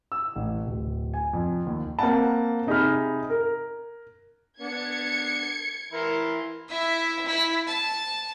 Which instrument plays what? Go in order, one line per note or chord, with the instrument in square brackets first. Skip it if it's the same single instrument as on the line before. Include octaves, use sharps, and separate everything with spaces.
[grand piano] E6
A1
D1
G#5
F2
D#2
A#3 C4 F#5 A5
C3 D#4 G#4 B5 F6
A#4
[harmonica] B3 D4 [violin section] G#6 C#7
[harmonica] E3 E4 C6 [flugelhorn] A#4
[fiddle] E4 E5
E4
A5